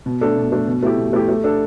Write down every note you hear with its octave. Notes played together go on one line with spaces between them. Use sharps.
B2
A3 D4 A4
B2
A3 D4 A4
B2
A3 E4 G4
B2
A3 E4 G4
A3
D4 A4